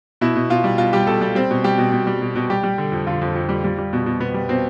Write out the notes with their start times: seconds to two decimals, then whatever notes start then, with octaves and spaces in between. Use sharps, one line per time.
0.21 B2 E4
0.36 B2
0.50 B2 F4
0.64 G3
0.78 B2 F4
0.93 G3 G4
1.07 B2 A4
1.21 G3 G4
1.35 G3 C4
1.50 B2
1.64 G3 G4
1.78 B2
1.92 B2
2.07 G3
2.21 B2
2.35 B2
2.50 G3 G4
2.64 G3
2.78 D3
2.92 F2
3.07 D3 F4
3.21 F2
3.35 F2
3.49 G3
3.64 G3
3.79 G3
3.93 B2
4.06 B2
4.20 B2 B3
4.34 G3
4.49 B2 C4